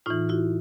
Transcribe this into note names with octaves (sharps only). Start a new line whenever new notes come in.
A2 E3 D#4 F4
E4 F#4